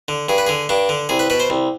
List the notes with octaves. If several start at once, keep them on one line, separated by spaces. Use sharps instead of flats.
D3
G2 G#4
B4
D3 G#4
G2 D4
D3
C2 G#4
B4
B2 B4
C5
C2